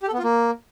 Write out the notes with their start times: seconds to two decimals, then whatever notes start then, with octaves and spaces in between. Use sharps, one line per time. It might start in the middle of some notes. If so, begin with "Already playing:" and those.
0.03 G4
0.08 A4
0.13 B3
0.18 F4
0.24 A#3